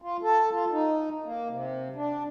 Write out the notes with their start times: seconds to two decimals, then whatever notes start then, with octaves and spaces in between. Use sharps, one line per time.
0.02 F4
0.23 A4
0.52 F4
0.72 D#4
1.25 A#3
1.49 C3
1.95 D4